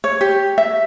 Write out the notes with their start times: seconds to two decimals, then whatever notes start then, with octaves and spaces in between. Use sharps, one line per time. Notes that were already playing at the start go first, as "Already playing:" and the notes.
0.04 C#5
0.21 G4
0.58 E5